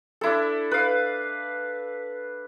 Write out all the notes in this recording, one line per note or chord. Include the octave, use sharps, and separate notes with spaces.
D4 E4 A4
B4 F5